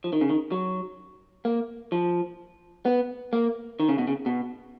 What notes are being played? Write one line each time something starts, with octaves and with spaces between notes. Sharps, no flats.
F3
D#3
C#3
D#3
F#3
A#3
F3
B3
A#3
D#3
C#3
B2
C#3
B2